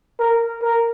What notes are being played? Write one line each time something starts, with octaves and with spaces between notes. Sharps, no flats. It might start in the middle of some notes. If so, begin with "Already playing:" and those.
A#4
A#4